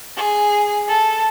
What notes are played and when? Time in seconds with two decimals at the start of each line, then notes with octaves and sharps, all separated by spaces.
0.16 G#4
0.88 A4